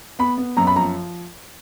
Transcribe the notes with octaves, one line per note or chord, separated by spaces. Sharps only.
B3 B5
B3
F#2 A#5
B5
F3 A#5